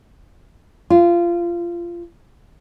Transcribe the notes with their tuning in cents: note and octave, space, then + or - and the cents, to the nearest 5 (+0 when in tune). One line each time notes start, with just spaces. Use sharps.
F4 -20